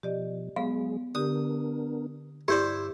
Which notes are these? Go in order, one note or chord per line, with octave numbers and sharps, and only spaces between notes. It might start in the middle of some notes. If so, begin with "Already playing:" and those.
B2 F3 G4 D5 D#5
F#3 G#3 B3 G#4 F5
D3 B3 D4 G4 A#4 D#6
G2 E4 G4 C5 D5